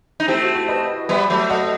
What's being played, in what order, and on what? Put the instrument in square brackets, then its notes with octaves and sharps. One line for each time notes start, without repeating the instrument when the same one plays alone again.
[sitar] D#4
[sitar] A3 C4 [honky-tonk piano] E4 G4
[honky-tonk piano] F#4
F#4
B4 D#5
[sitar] G3 B3 [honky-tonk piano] C5 E5
[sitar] F#3 A3
[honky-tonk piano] D#5 F#5